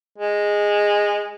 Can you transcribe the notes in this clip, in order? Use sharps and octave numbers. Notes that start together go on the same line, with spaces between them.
G#3